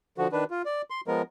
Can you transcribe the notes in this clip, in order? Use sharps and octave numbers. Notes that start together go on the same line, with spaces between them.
D3 F3 F#4
D#3 D4 B4
F4
D5
C6
F3 G#3 B3 A#4